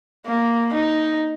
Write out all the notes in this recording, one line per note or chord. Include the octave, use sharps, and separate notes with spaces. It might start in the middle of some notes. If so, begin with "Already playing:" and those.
A#3
D#4